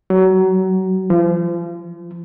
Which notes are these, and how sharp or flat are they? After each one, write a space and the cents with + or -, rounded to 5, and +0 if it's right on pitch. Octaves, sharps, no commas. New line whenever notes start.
F#3 +25
F3 -35